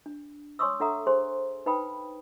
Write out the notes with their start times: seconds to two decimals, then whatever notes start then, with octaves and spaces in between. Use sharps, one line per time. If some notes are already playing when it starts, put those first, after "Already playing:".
0.06 D4
0.59 C#5 G#5 C6 C#6 D#6 E6
0.80 D4 A4 E5 F#5 A#5 D#6
1.07 G#4 C5 G#5 C6
1.66 D#4 B4 F5 G5 B5 D#6